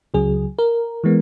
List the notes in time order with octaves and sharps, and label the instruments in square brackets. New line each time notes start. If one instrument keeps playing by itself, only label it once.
[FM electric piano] C#2 C#3 F#3 G#4
A#4
E3 G#3 B3